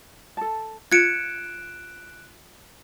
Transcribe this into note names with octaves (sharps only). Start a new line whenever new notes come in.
A4 A5
F4 F#6 G#6 C#7 D7 E7